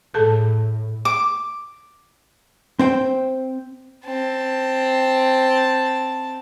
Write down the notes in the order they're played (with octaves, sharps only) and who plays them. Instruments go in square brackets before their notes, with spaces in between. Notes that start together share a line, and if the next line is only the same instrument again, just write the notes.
[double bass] A2 [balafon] G#4 A4 A5
[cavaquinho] D6
[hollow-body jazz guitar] C4 C5 G5
[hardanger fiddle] C4 A5